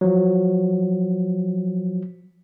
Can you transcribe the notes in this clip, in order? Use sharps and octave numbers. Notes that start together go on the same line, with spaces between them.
F3 F#3